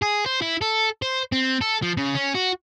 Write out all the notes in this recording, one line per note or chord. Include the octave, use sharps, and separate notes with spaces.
G#4
C5
E4
A4
C5
C4
A4
F3
C#3
C#4
F#4